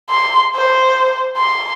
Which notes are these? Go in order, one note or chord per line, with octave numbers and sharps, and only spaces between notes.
C6
C5
C6